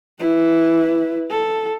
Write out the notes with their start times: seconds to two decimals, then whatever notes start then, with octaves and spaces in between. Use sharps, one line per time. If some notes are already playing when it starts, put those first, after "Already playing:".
0.19 E4 B4
1.30 A4